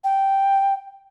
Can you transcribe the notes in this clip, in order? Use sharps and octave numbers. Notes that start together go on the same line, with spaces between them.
G5